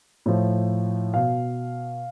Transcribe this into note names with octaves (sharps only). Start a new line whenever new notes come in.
A2 F3
B2 F5